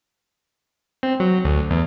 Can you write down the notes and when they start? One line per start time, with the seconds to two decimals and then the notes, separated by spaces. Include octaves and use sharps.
1.03 C4
1.20 F#3
1.44 D2
1.70 E2